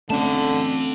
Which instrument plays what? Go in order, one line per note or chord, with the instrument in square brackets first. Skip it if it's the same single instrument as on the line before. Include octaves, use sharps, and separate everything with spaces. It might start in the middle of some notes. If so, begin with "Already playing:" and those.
[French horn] D3 [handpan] A3 C#4 [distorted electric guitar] C4 A5